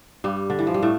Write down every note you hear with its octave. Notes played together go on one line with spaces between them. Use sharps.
G2 G3
D3
E3
F3
G3
A2 A3